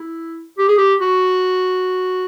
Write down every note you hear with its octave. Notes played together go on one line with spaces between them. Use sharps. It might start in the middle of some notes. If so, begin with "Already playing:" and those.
Already playing: E4
G4
G#4
G4
F#4